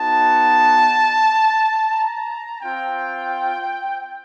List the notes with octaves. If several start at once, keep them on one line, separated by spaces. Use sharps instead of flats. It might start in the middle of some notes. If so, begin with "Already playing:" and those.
Already playing: B3 D#4 F#4 A5
A#5
C4 F4 G5